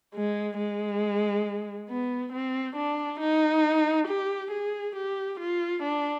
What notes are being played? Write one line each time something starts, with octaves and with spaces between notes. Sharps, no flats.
G#3
G#3
B3
C4
D4
D#4
G4
G#4
G4
F4
D4